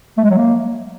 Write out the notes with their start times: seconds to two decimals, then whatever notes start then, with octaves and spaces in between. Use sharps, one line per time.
0.17 A3
0.24 G#3
0.31 F#3
0.37 A#3